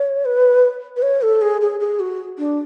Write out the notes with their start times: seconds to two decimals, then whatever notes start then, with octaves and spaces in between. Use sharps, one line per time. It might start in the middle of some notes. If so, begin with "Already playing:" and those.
Already playing: C#5
0.25 B4
0.97 B4
1.02 C#5
1.22 A4
1.42 G#4
1.61 G#4
1.80 G#4
2.00 F#4
2.38 D4